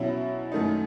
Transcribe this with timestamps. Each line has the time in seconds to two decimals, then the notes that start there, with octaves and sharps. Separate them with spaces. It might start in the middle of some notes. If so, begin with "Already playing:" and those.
Already playing: B2 F#3 C#4 E4
0.52 F#2 D#3 A3 D#4